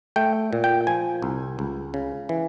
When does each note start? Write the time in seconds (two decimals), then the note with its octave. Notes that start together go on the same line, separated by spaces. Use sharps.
0.16 A3 G5
0.53 A#2
0.64 G5
0.87 F3 G#5
1.22 C2
1.59 C#2
1.94 C#3
2.29 E3